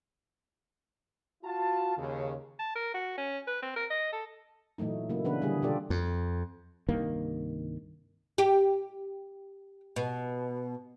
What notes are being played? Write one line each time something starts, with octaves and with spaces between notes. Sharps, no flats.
F4 F#4 A5
D#2 C#3
A5
A#4
F#4
C#4
B4
C4
A#4
D#5
A4
A#2 E3 F#3 A3 D#4
C#3 F#3 A#3 E4
C#3 E3 B3 D4 B4
D3 G3 B3 D4 G#4
B2 B3 F4 G4 A4 D5
F2
C2 G2 D#3 A#3
G4
B2